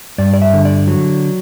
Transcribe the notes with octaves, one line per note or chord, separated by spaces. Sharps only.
G2 D5
D5
E5
D3
D5
F#3